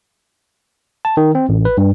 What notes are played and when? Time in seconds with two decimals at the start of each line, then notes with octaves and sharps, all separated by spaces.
1.05 A5
1.17 D#3
1.35 C4
1.49 A1
1.65 B4
1.77 G2